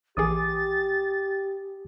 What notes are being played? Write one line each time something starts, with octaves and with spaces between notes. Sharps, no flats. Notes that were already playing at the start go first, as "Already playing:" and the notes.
A#1 E3 G4 G#4 G#5 D6 D#6 A6